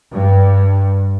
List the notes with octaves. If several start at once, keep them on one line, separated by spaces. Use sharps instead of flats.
G2